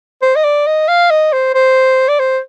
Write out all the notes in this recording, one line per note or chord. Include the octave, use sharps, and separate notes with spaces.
C5
D#5
D5
D#5
F5
D#5
C5
C5
D5
C5